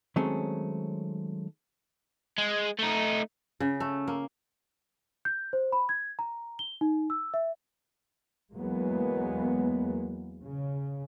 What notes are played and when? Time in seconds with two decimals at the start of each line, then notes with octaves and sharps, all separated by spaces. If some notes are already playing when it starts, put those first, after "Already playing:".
0.16 D#3 F#3 G#3 A3 C4 C#4
2.38 G#3
2.79 A3 D#4
3.60 C#3
3.80 A3
4.08 A#3
5.25 G6
5.53 C5
5.72 B5
5.89 G#6
6.19 A#5
6.59 G7
6.81 D#4
7.10 E6
7.34 E5
8.54 E2 F#3 G#3 A#3 B3
10.44 C#3